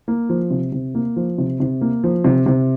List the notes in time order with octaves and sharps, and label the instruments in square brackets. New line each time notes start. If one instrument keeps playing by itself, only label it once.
[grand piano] A#3
F3
C3
C3
A#3
F3
C3
C3
A#3
F3
C3
C3